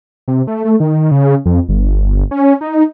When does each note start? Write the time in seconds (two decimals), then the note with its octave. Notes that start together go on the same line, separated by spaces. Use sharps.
0.28 C3
0.47 A3
0.65 A3
0.80 D#3
1.11 C#3
1.46 F2
1.69 G1
2.31 C#4
2.61 D#4